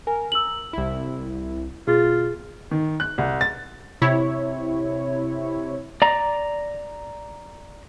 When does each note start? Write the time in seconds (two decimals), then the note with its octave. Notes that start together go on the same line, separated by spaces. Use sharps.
0.07 A#4 G#5
0.32 E6 F#7
0.73 C2 E4
1.87 B2 F4 G#4 A6
2.71 D#3
3.00 F#6
3.18 C2
3.41 A6
4.02 C3 E4 C#5
6.02 D5 A#5